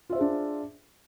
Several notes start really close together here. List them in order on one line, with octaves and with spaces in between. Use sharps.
F4 E5 C5 G#4 D4